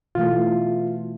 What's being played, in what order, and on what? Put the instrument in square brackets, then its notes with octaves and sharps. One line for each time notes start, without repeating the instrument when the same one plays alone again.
[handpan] B2 E3 A3 [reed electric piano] F4